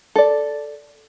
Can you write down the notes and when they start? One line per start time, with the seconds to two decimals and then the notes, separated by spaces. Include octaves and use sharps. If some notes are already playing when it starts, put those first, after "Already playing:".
0.16 A4 D5